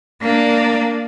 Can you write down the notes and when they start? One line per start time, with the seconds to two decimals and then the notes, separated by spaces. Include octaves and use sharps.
0.21 A#3 D4